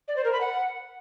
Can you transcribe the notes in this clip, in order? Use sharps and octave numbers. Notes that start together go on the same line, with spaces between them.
D5
C5
A#4
B5
F#5